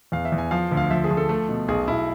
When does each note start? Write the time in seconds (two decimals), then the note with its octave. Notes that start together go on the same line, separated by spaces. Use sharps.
0.12 E2 F5
0.25 E5
0.32 E2
0.38 G#5
0.51 F3 F5
0.72 D2
0.77 F5
0.90 F3 E5
1.04 G#4
1.11 F3
1.17 A4
1.29 A3
1.49 B2
1.68 B1 G#4
1.88 B1 E4